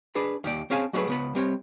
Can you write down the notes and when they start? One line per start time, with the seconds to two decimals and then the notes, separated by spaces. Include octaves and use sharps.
0.15 D4 G#4 B4 B5
0.44 D#2 G4 D5
0.70 C4 C#4 G#4 F5 G#5 A5
0.93 F#3 G3 A3 G#4 B4
1.08 C#2 B3 B5
1.35 G3 C4 C#5